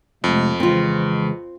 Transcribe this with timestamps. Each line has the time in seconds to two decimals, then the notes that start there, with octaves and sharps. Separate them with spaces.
0.24 F2 C3 G#3 A3
0.60 C#3 E3 G#3 C4 F4